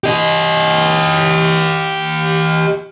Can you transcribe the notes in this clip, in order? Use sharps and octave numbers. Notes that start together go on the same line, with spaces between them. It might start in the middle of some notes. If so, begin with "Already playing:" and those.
G4 D#5